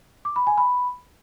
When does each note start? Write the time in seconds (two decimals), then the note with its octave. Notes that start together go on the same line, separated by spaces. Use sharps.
0.25 D6
0.36 B5
0.47 G#5
0.58 B5